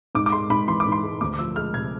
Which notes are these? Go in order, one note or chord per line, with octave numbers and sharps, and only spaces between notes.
G#2 D6
D6
G#3 C6
G#2 B5
E3 C6
D6
G#2
C6
G#3
D2 D6
D6
F3 E6
G#3 F6
C3 G#6